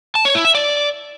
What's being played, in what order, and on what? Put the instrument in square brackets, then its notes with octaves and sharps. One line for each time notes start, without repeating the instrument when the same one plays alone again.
[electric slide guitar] A5
C#5
E4
E5
D5